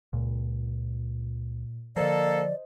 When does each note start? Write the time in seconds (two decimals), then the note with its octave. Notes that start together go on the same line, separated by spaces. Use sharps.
0.13 C#2 A#2
1.96 D3 F3 A#3 A4 C5 D5 D#5